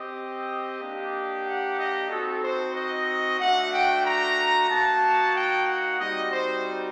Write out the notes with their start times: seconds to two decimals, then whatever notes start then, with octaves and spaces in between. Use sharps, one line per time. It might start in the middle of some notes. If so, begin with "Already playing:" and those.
Already playing: C4 G4 D#5
0.80 A#3 D4 G4
1.44 F#5
1.77 D#5
2.09 C4 D#4 F#4 A4
2.42 C5
2.74 D#5
3.39 A3 D4 F#4 F#5
3.72 G5
4.05 A#5
4.69 A#3 D#4 F#4 A5
5.34 G5
5.66 F#5
5.99 G3 C4 D#4 F#4 D#5
6.31 C5